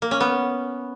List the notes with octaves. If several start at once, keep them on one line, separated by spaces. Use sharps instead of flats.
A#3
C#4
B3